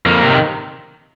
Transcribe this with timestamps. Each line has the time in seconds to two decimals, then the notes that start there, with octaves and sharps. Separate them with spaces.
0.06 F2 A#3
0.22 C3 D#3